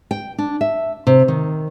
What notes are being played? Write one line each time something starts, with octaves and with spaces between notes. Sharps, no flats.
G5
D4
E5
C3
D#3